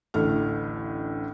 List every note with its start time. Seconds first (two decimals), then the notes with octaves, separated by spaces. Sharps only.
0.14 A1 D2 A2 A3 F6